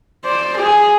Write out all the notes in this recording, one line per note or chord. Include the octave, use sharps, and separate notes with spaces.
C5 D5
G#4